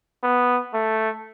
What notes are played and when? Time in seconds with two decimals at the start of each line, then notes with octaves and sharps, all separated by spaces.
0.23 B3
0.74 A3